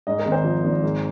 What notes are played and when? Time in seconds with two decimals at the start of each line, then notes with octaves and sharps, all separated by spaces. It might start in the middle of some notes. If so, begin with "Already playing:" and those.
0.07 G#2 D#5
0.19 A#4
0.26 G#1
0.32 C5
0.44 F3
0.64 G#1
0.82 G#2